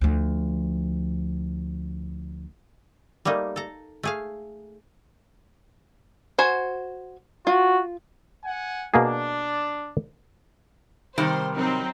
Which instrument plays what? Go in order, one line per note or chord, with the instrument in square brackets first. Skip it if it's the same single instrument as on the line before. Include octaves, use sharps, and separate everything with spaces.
[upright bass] D2 F3
[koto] G3 A3 A#3 D#4
A4 A#5
A3 G#4 F5
[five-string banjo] F#4 C5 G#5
[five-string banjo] F4 [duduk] F#4
[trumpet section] F#5 G#5
[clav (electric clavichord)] B2 A#3 G#4 [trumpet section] D4
[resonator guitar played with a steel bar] C3 D#3 G3 [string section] C5
[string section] F#3 C4 D#4